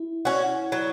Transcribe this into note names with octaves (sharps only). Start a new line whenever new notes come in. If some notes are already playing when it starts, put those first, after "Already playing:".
Already playing: E4
C#4 F#4
F#3